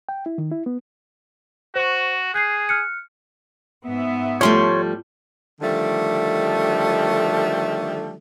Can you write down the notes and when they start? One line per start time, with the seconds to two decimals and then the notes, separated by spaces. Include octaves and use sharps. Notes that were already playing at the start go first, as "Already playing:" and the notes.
0.09 G5
0.26 E4
0.38 D#3
0.51 E4
0.66 B3
1.75 F#4 C5 C#6
2.34 G#4 F#6 G6 C7
2.69 F6 F#6 C#7
3.86 G#2 B3 E5
4.41 F3 G3 A3 C#5 C6
5.61 D3 D#3 F3 G3 A3